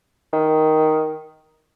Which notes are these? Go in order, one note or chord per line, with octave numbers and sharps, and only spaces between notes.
D#3